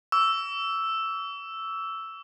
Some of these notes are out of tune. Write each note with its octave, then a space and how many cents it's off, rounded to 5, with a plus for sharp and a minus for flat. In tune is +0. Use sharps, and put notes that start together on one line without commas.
C#6 +45 E6 +0